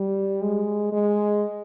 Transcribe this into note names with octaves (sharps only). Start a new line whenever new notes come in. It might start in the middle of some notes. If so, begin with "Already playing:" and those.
Already playing: G3
G#3
G#3